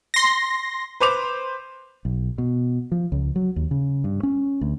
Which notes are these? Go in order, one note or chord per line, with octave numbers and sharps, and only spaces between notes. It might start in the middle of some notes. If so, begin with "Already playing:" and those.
C6 A#6
B4 C5 D6 F7
B1
B2
F3
C#2
F#3
D#2
C#3
G2
C#4
D2